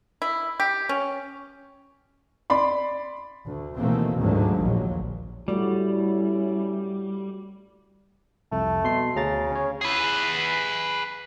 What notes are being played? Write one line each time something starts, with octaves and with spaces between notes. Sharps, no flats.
E4
G4
C#4
D5 B5 C6
D2
B2 D#3 E3 A3 A#3 C4
D2 G#2 D3 D#3 F3 F#3
A#1 D#2 A#2 F3 F#3
G3 A3 C#4 E4 F#4 D5
C2 F2 A3
B2 C6 C7
D2 C#3 A#5 A6
C#4 C#5
G#4 B4